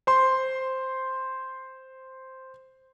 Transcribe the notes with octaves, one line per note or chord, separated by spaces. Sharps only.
C5 C6